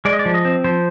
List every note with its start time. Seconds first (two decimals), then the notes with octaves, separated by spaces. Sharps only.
0.05 G#3 D5
0.13 D#5
0.19 D5
0.26 F3
0.34 D#5
0.45 C4
0.64 F3 C5